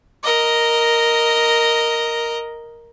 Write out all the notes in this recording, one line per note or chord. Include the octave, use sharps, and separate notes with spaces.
A#4 D#5